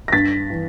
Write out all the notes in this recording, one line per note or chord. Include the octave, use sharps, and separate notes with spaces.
A#6
G2 A6 B6
E3